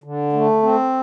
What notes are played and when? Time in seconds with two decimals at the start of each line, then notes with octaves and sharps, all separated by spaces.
0.04 D3
0.33 A3
0.62 C4